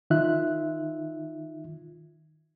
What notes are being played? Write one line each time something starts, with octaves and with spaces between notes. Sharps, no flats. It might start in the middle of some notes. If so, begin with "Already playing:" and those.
D#3 D#4 F4 E5 F#6